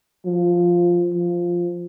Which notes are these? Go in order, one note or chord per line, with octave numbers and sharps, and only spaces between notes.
F3
F3